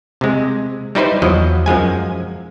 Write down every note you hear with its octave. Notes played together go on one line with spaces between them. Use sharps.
C3 G#3
G3 D#4 E4 B4 C5
E2 F3 F#3 D#5
F#2 F3 G#3 G#5